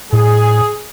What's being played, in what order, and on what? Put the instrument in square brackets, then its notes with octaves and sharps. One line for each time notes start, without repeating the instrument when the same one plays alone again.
[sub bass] A2 [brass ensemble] G#4